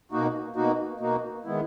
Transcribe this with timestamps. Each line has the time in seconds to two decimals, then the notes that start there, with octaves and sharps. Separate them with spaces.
0.12 B2 A#3 D#4 F#4
0.56 B2 A#3 D#4 F#4
1.00 B2 A#3 D#4 F#4
1.45 D#3 G#3 B3 E4